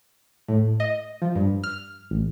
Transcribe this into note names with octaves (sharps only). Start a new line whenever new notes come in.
A2
D#5
F3
G2
F6
A1